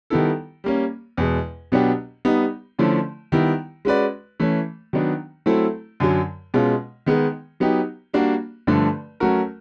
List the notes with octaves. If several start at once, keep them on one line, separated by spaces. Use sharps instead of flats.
D#3 G3 B3 E4 A4
G3 A#3 C#4
E2 B2 G#3
B2 F#3 B3 D4 G4
G3 B3 D#4
D3 F3 A3 C#4 E4
D#3 G3 B3 E4
G#3 C#4 F#4 B4 D5
E3 A3 C#4
D#3 F#3 B3 D4
F#3 A3 C4 E4 A4
F#2 D3 F#3
B2 G#3 C#4 F4
D#3 G#3 B3 D#4 G#4
F#3 B3 D#4 G4
G3 A#3 D4 F#4
G2 D3 F3 A3 D4
F#3 A3 C#4 F#4 A#4